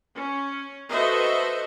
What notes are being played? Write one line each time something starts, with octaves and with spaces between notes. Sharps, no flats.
C#4
F#4 A4 B4 C5 D#5 E5